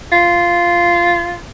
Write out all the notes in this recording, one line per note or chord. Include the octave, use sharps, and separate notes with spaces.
F4